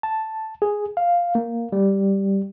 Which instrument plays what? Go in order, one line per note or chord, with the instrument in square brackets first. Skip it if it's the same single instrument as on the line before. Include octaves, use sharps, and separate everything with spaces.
[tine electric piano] A5
G#4
F5
A#3
G3